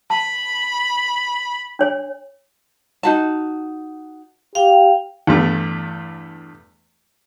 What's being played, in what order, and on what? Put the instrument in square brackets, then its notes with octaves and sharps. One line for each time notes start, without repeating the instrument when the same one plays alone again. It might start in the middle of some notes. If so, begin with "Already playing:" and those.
[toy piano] A5 [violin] B5
[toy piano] D4 C#5 G#5
[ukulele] D#4 F#4 A5
[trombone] G4 [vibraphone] F5 G5
[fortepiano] E2 G2 A3